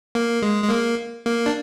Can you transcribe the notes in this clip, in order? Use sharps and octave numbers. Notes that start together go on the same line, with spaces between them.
A#3
G#3
G#3
A#3
A#3
D4